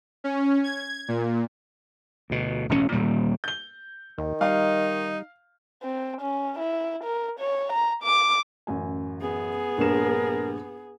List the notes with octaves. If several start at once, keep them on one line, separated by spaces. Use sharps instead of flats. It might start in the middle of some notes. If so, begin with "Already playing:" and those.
C#4
G#6
A#2
D2 B2
E1 A1 G#2 C#4
D#1 D2 A#2 G3
G6 G7
D#2 D#3
G3 D#4 F5
C4
C#4
E4
A#4
C#5
A#5
D6
A1 F#2 G#5
B3 G#4
A#1 G2 A#4 E7